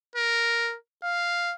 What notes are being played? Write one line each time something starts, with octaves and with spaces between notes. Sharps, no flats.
A#4
F5